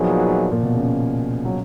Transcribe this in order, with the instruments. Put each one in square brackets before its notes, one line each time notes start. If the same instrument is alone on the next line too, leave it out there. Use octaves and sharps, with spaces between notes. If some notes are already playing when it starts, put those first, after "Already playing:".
Already playing: [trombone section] A#2 F#3 B3 D#4 G#4 [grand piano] F3
[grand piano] A#2
B2
C#3
F#3